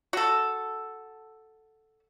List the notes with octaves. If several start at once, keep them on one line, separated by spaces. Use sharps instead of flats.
F#4 A4